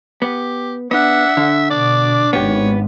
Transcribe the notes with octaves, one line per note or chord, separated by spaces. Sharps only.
B3 G4
B3 D4 E5 F#5
D3
B2 D4 D5
G#1 B3 G4 C#5